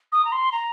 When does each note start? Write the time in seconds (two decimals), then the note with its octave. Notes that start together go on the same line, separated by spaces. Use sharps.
0.12 D#6
0.25 A#5
0.32 C6
0.52 A#5